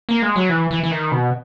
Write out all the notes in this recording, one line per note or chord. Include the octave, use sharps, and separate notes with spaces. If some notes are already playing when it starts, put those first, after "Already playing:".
A#3
G#3
F#3
E3
E3
E3
D#3
B2